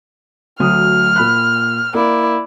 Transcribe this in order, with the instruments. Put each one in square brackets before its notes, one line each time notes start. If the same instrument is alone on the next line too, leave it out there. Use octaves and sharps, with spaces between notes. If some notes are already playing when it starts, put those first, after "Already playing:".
[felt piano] D2 F#3 D#6 [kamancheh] F6
[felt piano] A#2 B5 F#6
[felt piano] A#3 [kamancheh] E4 D5